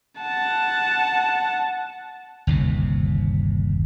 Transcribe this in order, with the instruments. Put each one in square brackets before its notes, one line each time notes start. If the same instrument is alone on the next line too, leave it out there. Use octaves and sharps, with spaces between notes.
[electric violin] F#5 A5
[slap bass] G1 D#2 C3